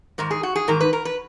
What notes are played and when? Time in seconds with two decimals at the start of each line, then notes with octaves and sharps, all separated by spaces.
0.18 G#2 D#3 A#4
0.31 G#4
0.43 F#4
0.56 G#4
0.68 G#2 D#3 A#4
0.80 B4
0.93 A#4
1.05 B4